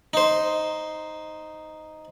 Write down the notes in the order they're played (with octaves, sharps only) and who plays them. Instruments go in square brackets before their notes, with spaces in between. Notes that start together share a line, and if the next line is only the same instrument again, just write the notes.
[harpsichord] D#4 C5